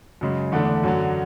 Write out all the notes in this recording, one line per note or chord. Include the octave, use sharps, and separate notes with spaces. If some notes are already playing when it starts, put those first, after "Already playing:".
F#2 C#3 G#3
E2 D3 A3 D4
F#2 D3 F#3